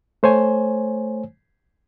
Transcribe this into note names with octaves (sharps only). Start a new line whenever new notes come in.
A3 C5 C#5 G#5